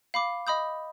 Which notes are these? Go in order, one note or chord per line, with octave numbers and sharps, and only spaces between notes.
F5 B5 D6
D#5 B5 D#6 G6